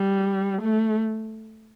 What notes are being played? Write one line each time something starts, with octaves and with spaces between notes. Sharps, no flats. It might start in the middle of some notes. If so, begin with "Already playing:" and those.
Already playing: G3
A3